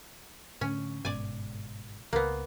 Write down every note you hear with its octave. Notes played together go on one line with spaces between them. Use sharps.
A2 D3 A3 C#4
G1 G#2 B2 D5 G#5
C#2 A#3 B3